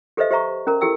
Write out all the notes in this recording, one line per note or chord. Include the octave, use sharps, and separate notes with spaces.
G4 A4 B4 C5 D#5 E5
G4 C5 E5 A#5 C#6
C#4 A#4 A#5
E4 G4 A4 G5 E6